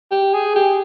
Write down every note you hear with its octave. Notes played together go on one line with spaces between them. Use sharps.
G4
G#4
G4